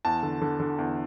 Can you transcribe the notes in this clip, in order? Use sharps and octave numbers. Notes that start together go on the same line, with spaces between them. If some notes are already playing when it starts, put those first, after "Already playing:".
E2 A5
D3
D3
D3
E2